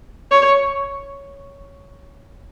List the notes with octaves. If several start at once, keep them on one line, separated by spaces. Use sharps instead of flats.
C#5